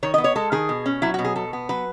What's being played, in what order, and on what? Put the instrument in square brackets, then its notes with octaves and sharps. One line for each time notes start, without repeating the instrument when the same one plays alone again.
[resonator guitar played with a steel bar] D#3 C#5
D#5
B3
C#5
G#3 A4
D#3 G#4
B2
C#4
F#3 E4
F#4
B2
G#4
B2 A4
B3
F#3 B4